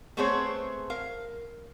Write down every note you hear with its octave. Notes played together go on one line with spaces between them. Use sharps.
A3 B3 C4 G#4 C5 C#5
A#4 F5